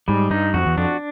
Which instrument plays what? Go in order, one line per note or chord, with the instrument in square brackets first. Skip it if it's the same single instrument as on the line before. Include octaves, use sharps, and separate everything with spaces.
[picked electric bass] G#2 [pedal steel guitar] G3
[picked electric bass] G2 [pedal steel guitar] D#4
[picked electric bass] F2 [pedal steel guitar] F#4
[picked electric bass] E2
[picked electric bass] F2 [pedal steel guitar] D4